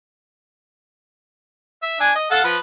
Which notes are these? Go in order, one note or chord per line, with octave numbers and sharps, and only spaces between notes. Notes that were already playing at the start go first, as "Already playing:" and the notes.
E5
D4 G#5
D#5
A4 F5 F#5
F3 B4